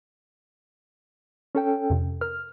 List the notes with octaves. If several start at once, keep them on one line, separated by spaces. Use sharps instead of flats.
C#4 A4 G5
F2 C3
A#4 F6